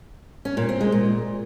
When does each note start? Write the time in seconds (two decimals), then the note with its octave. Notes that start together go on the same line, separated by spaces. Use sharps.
0.45 C#4
0.57 A#2
0.69 C4
0.81 G#3
0.92 A#2